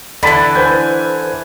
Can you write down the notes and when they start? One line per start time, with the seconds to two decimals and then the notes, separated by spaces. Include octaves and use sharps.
0.23 D2 D3 E3 A5 B5
0.55 B4 C5 G#5 G6